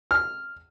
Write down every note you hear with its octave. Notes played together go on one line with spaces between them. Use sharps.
F6